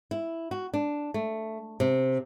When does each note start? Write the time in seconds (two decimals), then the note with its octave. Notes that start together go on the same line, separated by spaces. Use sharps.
0.11 E4
0.51 F#4
0.74 D4
1.14 A3
1.80 C3